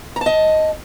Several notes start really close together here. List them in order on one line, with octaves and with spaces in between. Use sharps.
A#5 A5 D#5